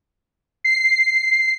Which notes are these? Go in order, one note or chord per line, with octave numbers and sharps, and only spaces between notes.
C7